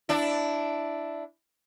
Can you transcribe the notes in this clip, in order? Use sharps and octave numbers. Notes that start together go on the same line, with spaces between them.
D4 E4